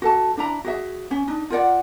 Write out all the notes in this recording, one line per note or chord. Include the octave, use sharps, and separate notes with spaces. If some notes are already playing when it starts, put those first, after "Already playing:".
F#4 A4 A5
D4 E4 A#5
F#4 G#4 E5
C#4
D4 D#4
F4 A#4 D5 F#5